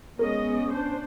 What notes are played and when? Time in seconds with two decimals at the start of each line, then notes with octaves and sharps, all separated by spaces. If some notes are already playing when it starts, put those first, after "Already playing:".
0.19 G#3 B3 C#4 A#4 D#5
0.70 D4 C5